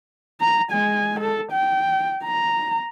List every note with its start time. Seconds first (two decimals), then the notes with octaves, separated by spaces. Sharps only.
0.41 A#5
0.71 G#3 G#5
1.20 A4
1.52 G5
2.24 A#5